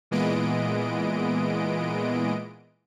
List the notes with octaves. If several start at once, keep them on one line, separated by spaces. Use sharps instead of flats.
A#2 E3 G#3 B3 D#5 D7